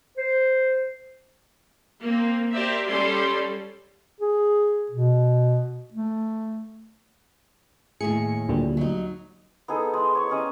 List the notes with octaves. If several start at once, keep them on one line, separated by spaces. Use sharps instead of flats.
C5
A#3 C4
G4 A#4 C5 D5 E5
G3 C#4 A4 D5 C6
G#4
B2
A3
D#2 A2 G#4 C#7
D2 A#2 G3
F#3 D#4
B3 D#4 G#4 A4
G#3
C#5 C#6
G3 C#4 D#5